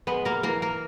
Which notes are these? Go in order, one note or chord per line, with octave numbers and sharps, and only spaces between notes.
G#3 B3 B4
A#3 A#4
E3 A#3 A#4
A#3 A#4